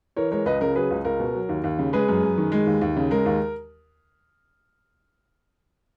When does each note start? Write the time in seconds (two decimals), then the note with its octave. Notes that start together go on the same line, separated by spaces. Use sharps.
0.16 E3 A#4 C#5
0.32 G#3 A#4 C#5
0.46 C#2 B4 D#5
0.61 C#3 A#4
0.75 F#3 G#4 B4
0.91 C#2
1.05 C#2 A#4
1.19 B2
1.34 F#3
1.49 D#2
1.64 D#2
1.79 C#3
1.93 G#3 G#4 B4
2.08 F#2
2.23 F#2
2.38 D#3
2.52 G#3
2.67 D#2
2.81 D#2
2.97 C#3
3.11 G#3 A#4
3.26 D#2